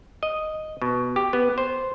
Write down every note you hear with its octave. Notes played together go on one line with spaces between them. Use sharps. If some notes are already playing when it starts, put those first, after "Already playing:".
D#5
B2
G4
B3
C5